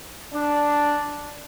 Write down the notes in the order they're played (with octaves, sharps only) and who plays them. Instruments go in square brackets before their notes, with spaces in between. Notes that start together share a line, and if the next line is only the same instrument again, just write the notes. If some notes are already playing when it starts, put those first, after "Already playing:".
[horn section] D4